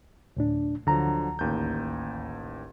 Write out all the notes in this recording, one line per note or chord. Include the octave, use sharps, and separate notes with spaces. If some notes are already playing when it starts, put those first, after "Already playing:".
D2 A2 D4
D2 D3 F3 F#3 A#5
A1 D#2 G6